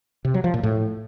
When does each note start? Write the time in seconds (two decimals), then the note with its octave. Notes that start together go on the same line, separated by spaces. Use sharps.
0.25 C3
0.34 F#3
0.44 F3
0.54 A#2
0.63 A2